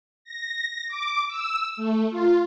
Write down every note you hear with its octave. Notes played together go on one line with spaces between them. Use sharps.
A#6
D6
E6
A3
F4